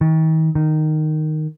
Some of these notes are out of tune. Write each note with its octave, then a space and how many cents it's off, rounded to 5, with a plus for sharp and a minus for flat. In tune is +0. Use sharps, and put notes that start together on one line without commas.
D#3 +40
D#3 -10